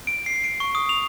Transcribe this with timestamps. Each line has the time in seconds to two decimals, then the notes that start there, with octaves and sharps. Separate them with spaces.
0.07 D7
0.26 C7
0.44 D7
0.60 C#6
0.75 D#6
0.89 F7